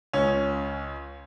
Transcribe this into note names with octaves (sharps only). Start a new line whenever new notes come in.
C#2 C#4